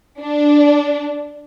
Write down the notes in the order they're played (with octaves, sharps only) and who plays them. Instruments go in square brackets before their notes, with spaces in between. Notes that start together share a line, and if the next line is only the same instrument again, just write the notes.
[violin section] D4